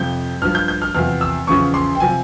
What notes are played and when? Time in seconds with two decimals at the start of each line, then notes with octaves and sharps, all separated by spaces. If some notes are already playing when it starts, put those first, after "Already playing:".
Already playing: F2 C3 F3 G6
0.42 G2 F3 F6
0.55 G6
0.68 G6
0.82 F6
0.94 E2 C3 F3 F6
1.21 E6
1.47 E2 C#3 F3 C#6
1.74 C6
1.95 G5
2.00 C3 F3 G#5